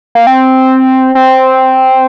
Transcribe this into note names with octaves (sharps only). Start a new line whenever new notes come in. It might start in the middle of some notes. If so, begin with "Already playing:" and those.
A#3
C4
C4